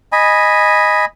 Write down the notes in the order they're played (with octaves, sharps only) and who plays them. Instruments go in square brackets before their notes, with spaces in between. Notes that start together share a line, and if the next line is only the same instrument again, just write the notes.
[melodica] D#5 G#5 B5